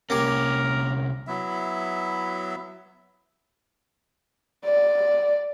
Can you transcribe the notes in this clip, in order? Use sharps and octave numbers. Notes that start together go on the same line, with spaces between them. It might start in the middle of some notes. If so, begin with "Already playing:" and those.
C2 A#3 C#4 G4 A#4
F#3 B3 E4 E5
D5